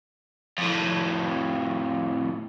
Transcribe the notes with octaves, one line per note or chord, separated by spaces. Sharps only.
F2 A2